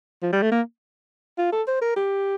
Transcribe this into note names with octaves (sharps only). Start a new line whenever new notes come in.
F3
G3
A3
A#3
F4
A4
C5
A#4
G4